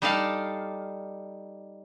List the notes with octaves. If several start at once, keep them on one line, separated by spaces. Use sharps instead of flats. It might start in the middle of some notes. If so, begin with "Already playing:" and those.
G3 D#4 A4 D5 F5